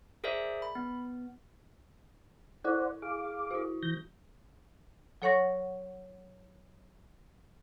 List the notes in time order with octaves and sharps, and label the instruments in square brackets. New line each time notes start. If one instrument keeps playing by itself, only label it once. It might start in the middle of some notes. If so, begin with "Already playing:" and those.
[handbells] G#4 A#4 C5 D5 E5
B5
B3
[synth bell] E4 A4 [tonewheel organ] C5 D5 F#5
[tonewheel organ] G#4 F5 D6
[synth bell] E4 F#4
[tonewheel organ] E3 G6 A#6
[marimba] F#3 A4 C#5 F#5 C#6 A#6